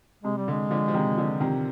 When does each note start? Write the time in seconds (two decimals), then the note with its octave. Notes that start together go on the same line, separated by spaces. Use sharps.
0.23 C3 G#3
0.37 G3
0.48 D3
0.51 G#3
0.71 D3 F3
0.88 F3
0.94 C3 D#3
1.17 D3 F3
1.40 C3 D#3